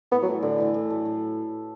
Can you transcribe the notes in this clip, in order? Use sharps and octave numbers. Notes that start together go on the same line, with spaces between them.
A2 B3
F#3
E3 A3 E4
A2 D3
E3 A3 E4
A2
F#3 A3
A2